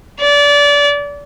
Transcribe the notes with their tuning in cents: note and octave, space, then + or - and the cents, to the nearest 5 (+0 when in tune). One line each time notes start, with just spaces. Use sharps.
D5 -25